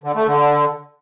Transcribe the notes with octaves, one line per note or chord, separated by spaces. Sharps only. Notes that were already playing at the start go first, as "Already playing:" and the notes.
D3
A3
D3